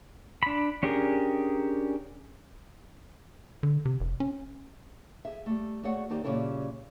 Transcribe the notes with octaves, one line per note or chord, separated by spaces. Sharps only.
D4 B5
C#4 D4 G4 G#4 A#4
D3
C3
F1
C#4
G#4 E5
G3 A3
A3 F#4 G#4 C#5 D5 F#5
D#2 D#4 G4 C5 D5
A#2 C#3 G3 C#4 E4 A4